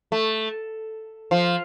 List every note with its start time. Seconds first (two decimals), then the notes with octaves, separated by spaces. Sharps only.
0.12 A3
1.31 F3